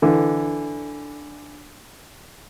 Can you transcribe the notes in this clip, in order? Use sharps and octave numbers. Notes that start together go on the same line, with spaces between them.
D3 E3